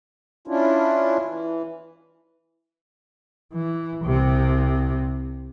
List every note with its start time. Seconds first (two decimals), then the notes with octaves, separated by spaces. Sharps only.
0.48 C#4 D4 E4 F4
1.25 E3
3.53 E3
4.04 C2 C3